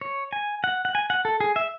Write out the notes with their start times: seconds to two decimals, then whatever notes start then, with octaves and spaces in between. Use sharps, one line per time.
0.01 C#5
0.33 G#5
0.64 F#5
0.85 F#5
0.95 G#5
1.10 F#5
1.25 A4
1.40 G#4
1.56 E5